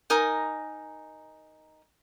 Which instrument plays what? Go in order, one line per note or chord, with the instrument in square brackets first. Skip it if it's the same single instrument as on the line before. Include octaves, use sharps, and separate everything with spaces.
[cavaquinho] D#4 A#4 G#5 D#6